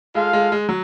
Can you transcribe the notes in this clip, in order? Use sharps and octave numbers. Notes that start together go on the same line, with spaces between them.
G#3 F4 A4 F5
G#3
G#3
F#3